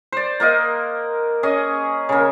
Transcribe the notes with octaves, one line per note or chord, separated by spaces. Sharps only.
C5 D5
A#3 A#4 D#5 F#5
C#4 G#4 D#5
C#3 A#3